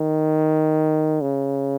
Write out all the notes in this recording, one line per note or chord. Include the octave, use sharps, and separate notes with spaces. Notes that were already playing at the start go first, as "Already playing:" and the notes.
Already playing: D#3
C#3